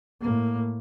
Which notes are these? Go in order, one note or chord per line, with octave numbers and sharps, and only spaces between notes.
A2 A#3